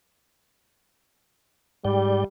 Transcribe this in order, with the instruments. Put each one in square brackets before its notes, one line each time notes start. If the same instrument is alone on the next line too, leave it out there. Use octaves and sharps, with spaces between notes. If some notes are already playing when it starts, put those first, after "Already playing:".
[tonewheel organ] G#2 D5 G5 [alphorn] G3